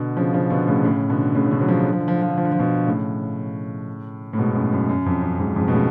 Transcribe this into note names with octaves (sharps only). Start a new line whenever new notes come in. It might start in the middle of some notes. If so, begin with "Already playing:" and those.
Already playing: B2 D3
C#3 F3
C#3 F3
B2 D3
A2 C#3
A2 C#3
B2 D3
A2 C#3
C#3
B2 D3
F#3
C#3 F3
D3
F3
D3
F3
D3
F3
D3
F3
D3
F3
B2 D3
A2 C#3
A2
G#2 B2
F#2 A2
F#2
F#2
F2
F#2
F2 G#2
F2 G#2
B2
A2 C#3